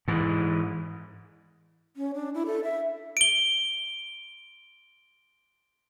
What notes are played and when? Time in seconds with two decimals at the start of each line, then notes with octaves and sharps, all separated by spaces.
0.08 G#2 E3
1.97 C#4
2.14 D4
2.34 E4
2.46 A4
2.64 E5
3.17 D7 G7